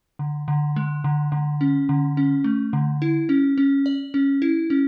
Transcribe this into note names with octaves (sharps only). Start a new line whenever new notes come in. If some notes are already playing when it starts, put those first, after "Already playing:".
D3
D3
G#3
D3
D3
C#4
D3
C#4
A3
D3
E4
C#4
C#4
D5
C#4
E4
C#4